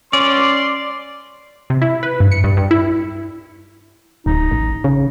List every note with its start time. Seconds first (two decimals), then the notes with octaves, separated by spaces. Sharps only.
0.13 C#4 D5 C6
1.70 C3
1.82 E4
2.03 B4
2.20 G2
2.32 C#7
2.44 G2
2.57 G2
2.71 E4
4.26 D1 D#4
4.51 A1
4.84 C#3